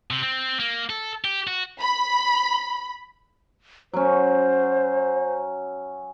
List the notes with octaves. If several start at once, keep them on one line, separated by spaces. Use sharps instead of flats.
C3
C4
A#3
A4
G4
F#4
B5
F#3 C#4 C5